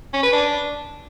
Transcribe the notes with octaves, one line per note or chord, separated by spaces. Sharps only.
C#4
B4
D4